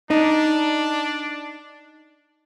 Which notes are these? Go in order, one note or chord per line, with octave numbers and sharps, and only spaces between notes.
D4 D#4